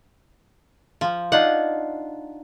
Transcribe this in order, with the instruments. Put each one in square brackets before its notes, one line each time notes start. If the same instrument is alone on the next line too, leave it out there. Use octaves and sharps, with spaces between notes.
[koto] F3
[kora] D4 D#4 F4 [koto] F#5